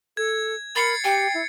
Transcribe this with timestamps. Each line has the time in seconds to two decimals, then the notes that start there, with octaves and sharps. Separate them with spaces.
0.17 A4 G#6
0.76 A#4 B5 A6 C7 C#7
1.04 G4 G5
1.34 E4